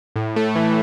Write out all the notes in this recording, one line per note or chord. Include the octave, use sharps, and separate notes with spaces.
A2
A3
E3